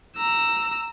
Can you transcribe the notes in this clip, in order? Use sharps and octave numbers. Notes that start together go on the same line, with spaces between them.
A#5 E6